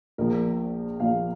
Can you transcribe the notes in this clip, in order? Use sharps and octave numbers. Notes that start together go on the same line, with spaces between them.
A#1 A#2 F3 A#4
A#1 A#2 F3 F5